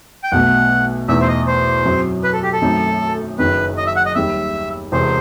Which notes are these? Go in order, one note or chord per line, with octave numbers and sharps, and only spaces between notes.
G5
B1 B2 A3 F#5
E2 B2 A3 D#4 E5
C5
D#5
C5
F#2 F#3 C4
B4
A4
G4
A4
F#2 D#3 A3 C4 D#4
F#1 F#2 D#3 B4
D#5
E5
F#5
D#5
D#2 D#3 G3 E5
E1 E2 C3 C5